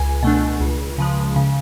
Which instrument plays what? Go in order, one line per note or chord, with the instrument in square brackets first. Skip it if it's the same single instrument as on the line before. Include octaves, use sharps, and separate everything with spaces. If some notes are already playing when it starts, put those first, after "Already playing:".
Already playing: [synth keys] C#2 G#5
B2 A3 D4
C#2
C#3 F3 G#3
C#3